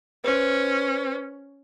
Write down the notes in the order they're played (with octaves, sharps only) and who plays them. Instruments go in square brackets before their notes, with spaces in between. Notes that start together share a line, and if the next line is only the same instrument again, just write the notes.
[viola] C#4 [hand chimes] B4 C5